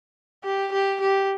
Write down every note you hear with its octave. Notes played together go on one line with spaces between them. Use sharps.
G4
G4
G4